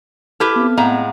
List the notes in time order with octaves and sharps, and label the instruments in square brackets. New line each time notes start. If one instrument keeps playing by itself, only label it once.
[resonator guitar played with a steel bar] E4 G4 B4 [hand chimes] A4 A5 F6
[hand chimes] B3 C4
[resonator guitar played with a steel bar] A2 G#3 A#5 [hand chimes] F5 F#5